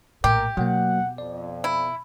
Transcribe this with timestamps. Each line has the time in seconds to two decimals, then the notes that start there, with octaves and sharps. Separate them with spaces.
0.24 A#1 A2 G4 A#4 D6
0.57 B2 F#3 A#3 F#5
1.18 F2 D5
1.64 E4